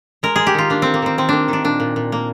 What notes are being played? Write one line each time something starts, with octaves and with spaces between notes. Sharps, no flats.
G#3 A#4
G#3 G#4
G4
D#3 F4
A#3 D4
D#3 C4
A#3
D#3 C4
D#3 C4
A#3 D4
D#3 D4
A#2 D4
A#2
A#2
A#3